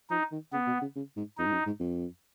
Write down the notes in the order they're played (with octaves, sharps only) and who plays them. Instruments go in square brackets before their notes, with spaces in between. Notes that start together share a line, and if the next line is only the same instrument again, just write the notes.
[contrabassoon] F3 [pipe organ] D#4
[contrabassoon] D#3
[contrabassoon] C#3 [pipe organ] B3
[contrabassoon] B2
C#3
C#3
G#2
[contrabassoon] F2 [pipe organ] D#4
[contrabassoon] G#2
F#2
G#2
F2